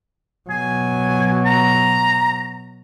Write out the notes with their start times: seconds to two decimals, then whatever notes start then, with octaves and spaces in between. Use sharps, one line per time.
0.50 B2 F#3 G#5
1.45 A#5